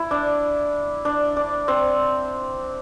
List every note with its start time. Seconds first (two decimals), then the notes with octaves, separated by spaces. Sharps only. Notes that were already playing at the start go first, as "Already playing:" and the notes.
Already playing: E4
0.11 D4
1.05 D4
1.37 D4
1.68 C4